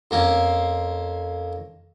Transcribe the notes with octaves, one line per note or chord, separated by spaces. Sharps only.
F2 A#3 C#4